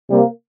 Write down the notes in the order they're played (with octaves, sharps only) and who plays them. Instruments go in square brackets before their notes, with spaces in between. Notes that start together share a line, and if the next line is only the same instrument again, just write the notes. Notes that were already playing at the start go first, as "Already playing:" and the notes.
[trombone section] C3 G3 A#3